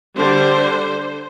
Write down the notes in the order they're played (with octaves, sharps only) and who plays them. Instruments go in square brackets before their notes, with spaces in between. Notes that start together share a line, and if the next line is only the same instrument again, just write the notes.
[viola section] D3 G3 D4 C5